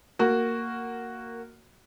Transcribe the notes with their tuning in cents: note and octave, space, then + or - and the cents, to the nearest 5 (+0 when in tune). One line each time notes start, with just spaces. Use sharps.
A#3 -10 F#4 +0